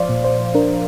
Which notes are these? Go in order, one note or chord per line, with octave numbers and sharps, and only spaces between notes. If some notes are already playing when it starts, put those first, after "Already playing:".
Already playing: F3 C5 D5 F5
A#2
C5
D4 A#4